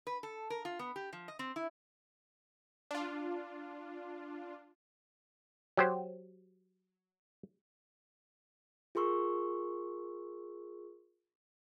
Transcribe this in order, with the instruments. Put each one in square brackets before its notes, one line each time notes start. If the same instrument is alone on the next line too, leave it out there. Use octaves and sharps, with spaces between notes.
[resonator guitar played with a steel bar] B4
A4
A#4
F4
B3
G4
F3
D#5
C4
E4
[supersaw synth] D4 F4
[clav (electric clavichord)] F#3 G4 C5
[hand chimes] F4 G#4 A#4 C6 C#6 E6